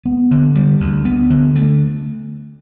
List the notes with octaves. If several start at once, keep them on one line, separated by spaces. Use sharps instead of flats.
B3
D3
G3
D2
B3
D3
A3